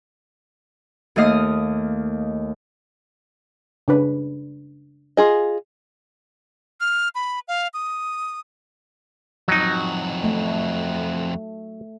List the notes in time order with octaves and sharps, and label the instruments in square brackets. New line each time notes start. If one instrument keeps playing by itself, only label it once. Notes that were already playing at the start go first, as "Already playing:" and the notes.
[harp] D#2 A3 D#5 F5 D#6
[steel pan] C#3 D4 B4
[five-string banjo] F4 G#4 D#5
[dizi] F6
B5
F5
D#6
[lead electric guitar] F2 F#4 [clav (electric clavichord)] F#3 D#4
[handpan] A3